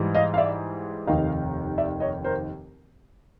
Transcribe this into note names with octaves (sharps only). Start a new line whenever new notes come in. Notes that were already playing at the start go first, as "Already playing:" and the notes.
Already playing: G#2 E3 G3
D#5 F5
F5
D5 E5
F1 D#2 D#3 D#5 F5
D5 E5
C#5 D#5
A#4 C5